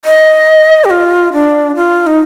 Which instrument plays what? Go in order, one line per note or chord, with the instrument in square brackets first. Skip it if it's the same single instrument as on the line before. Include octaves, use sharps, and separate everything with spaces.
[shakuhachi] D#5
G4
F4
D4
F4
D#4